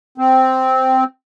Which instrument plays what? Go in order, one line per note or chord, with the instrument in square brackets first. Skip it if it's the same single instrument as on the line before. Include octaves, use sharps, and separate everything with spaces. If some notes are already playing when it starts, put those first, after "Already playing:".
[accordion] C4